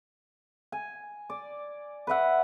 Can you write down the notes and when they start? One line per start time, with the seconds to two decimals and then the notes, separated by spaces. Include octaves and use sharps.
0.72 G#5
1.30 D5
2.07 B4 D5 E5 F#5